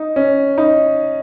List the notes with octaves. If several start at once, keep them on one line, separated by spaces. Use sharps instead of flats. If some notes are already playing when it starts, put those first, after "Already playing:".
Already playing: D#4
C#4
D#4